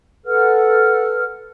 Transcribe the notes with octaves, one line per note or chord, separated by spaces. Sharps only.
A4 B4 F#5 F6